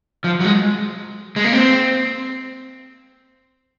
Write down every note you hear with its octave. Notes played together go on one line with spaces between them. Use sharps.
F3
F#3
G#3
G#3
A#3
C4